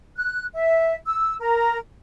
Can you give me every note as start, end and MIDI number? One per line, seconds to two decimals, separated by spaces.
0.16 0.47 90
0.53 0.94 76
1.06 1.35 88
1.39 1.77 70